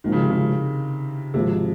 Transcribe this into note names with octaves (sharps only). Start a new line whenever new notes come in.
G#1 G#2 D#3 F3
C#3
C3
C#3
G#1 G#2 C3 F3 G#3